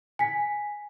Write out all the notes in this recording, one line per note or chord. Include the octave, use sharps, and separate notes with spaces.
G#5 B6